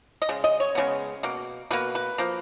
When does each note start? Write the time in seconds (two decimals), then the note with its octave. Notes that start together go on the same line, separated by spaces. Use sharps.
0.22 D#5
0.29 C#3 G#3
0.44 D#5
0.60 C#5
0.75 C#3 G#3 B3
1.23 B2 A#3
1.71 B2 A#3 B4
1.95 B4
2.18 F3 A#3